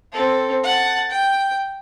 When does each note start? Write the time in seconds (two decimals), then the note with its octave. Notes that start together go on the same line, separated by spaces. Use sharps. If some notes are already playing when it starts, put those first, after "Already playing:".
0.12 C4 A4
0.64 F#5 A5
1.11 G5